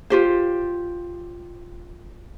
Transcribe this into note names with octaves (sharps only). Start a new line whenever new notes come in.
F4 G4 C5